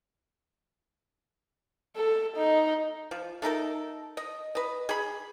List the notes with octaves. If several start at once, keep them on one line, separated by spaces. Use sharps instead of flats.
A4
D#4
F3
A3 D#4 A4 A#4
D#5
B4 D#5
G#4 B5